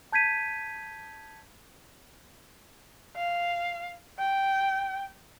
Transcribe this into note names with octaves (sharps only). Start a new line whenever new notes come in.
A5 G6 G#6 B6 D#7
F5
G5